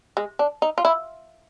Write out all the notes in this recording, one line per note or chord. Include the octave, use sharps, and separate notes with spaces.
G#3
D4
D#4
F4
E4